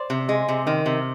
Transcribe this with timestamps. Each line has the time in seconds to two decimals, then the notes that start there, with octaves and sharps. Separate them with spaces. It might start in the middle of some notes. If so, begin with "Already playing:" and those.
Already playing: C5 D5
0.10 C3
0.29 G#3
0.48 C3
0.67 D#3
0.86 C3